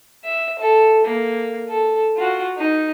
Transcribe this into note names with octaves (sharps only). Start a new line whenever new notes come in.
E5
A4
A#3
A4
F4 F#4
D#4